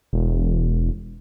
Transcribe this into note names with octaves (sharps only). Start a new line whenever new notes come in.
E1